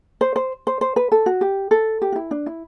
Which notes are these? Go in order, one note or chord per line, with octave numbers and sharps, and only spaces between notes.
C5
C5
C5
C5
B4
A4
F#4
G4
A4
G4
F#4
E4
D4
E4